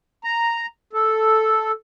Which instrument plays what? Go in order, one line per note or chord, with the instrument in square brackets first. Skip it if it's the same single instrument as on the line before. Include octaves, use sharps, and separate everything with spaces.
[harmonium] A#5
A4